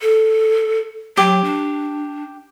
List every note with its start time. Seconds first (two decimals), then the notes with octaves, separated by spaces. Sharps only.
0.01 A4
1.17 F#3 G4
1.44 D4